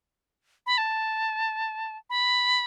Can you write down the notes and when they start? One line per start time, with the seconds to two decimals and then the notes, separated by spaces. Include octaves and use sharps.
0.66 B5
0.78 A5
2.10 B5